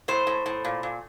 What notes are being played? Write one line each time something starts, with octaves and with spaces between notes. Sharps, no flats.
A2 C5
A2
A2
A#2
A#2